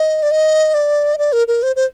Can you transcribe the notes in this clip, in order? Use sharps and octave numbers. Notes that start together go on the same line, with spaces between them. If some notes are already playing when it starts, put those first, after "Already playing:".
Already playing: D#5
D5
D#5
D5
D#5
D5
A#4
A#4
C5
C5